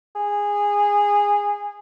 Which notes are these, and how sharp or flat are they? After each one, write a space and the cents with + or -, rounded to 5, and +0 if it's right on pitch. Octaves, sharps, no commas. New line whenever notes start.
G#4 -15